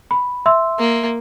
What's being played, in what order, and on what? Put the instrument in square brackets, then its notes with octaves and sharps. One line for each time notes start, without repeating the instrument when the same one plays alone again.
[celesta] B5
E5 C6 E6
[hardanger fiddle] A#3